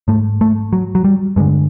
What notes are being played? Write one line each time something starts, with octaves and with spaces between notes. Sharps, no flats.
G#2 A3
A3
F#3
F#3
G3
G2 D3 G#3